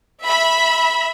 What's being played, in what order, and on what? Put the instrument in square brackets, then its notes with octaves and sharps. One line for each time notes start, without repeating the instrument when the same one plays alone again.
[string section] E5 B5